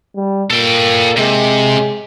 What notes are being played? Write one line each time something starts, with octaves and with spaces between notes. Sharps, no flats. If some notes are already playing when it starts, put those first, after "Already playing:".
G3
A#2 A4 G5
C3 G#3